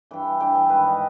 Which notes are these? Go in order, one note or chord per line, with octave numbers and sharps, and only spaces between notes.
G2 E3 G5
G2 E3 G5
E5
G#2 D#3 B4
D#5